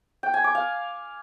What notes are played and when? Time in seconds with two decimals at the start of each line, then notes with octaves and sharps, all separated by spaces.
0.23 G5
0.34 G#5
0.44 D6
0.55 F5